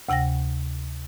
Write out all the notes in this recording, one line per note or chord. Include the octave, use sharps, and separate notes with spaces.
D2 C3 F#5 G5 A#6